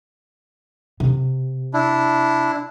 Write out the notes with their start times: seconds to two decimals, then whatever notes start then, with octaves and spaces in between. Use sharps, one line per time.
1.00 C3
1.74 D4 E4